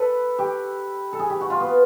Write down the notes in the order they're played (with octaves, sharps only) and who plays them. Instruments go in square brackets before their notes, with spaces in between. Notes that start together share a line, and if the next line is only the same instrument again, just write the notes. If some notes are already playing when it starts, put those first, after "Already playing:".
Already playing: [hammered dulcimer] A4 B4
G4
A4
G#4
G4
F#4
F4
B3